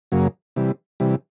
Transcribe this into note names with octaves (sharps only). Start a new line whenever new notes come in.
F#2 C#3 F#3 A#3
C3 E3 G3
C3 E3 G3